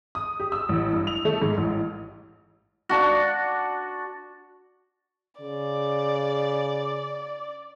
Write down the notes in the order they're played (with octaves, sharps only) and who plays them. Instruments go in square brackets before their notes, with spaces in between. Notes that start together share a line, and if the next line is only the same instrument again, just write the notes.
[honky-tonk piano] D#6
G4
E6
A1
G2
F7
A3
G#2
A1
[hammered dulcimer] D4 F#4
[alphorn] C#3 [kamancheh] D5